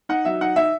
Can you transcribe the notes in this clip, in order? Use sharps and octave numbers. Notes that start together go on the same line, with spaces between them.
D#4 F#5
F#3 E5
D#4 F#5
D#4 E5